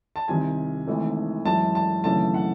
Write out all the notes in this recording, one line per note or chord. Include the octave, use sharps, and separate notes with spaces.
A5
C2 C3 D#3 G#5
G#1 G#2 E3 A3
F#2 E3 G#3 A5
A5
G#1 F#2 C#3 E3 A3 A5
F#5